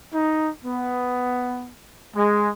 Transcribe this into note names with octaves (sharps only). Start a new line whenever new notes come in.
D#4
B3
G#3